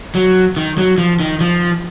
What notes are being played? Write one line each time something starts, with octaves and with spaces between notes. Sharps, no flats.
F#3
D#3
F#3
F3
D#3
F3